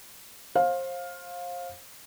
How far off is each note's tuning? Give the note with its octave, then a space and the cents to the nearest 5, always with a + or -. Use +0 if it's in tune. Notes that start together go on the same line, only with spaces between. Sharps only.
C5 +30 F5 +15